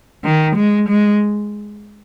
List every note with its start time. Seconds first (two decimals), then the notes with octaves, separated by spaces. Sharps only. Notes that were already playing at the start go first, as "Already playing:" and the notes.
0.25 D#3
0.56 G#3
0.89 G#3